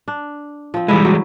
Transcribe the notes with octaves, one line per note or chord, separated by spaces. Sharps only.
D4
F3 C4
E3 G3 G#3 E4 A4 E5
F#3